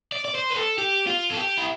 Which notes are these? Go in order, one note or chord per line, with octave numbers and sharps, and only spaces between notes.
D5
D5
C5
B4
A4
G4
F4
A4
G4
E4